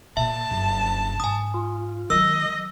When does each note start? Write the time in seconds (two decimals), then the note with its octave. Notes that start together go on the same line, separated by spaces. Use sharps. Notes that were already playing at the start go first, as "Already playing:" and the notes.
0.17 A#2 E5 A5
0.51 F#1 G2
1.20 G#2 G#5 D#6
1.54 F4
2.10 D#3 F#3 G#3 D#5 E6